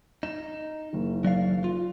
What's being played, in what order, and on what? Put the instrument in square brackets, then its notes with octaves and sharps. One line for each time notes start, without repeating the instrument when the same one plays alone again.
[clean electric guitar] D#4 [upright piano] E7
[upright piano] F#1 D#3
[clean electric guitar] F#3 D5 F5
F4